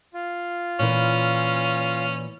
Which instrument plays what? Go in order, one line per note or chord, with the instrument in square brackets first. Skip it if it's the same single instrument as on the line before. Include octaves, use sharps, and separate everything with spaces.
[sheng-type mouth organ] F4
[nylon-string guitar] A#2 E3 [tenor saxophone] C#4